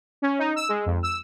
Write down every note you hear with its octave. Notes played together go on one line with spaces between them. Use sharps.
C#4
D#4
E6
G#3
F2
E6